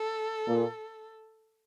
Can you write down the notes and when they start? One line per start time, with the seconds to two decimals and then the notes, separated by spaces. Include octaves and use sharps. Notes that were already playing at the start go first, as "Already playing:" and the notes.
Already playing: A4
0.47 A#2